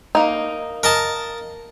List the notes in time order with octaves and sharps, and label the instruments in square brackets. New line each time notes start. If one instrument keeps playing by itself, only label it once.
[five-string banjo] A#3 D#4
[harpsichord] A#4 D#5 A5